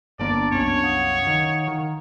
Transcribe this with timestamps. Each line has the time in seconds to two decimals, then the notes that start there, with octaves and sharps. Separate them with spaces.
0.19 G1 D3 A#3 B3 D4 D5 A5
0.52 C2 F#2 C#4 C#5
0.83 F5 F#5 D#6
1.27 D#3
1.68 D#3